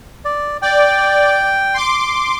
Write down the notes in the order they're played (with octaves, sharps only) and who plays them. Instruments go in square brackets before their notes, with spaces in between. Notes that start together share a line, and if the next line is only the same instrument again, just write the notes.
[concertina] D5
[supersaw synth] D5 [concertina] G5
[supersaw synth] C6 D6